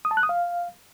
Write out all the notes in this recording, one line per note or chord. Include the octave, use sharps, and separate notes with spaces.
D#6
A5
F#6
D#6
F5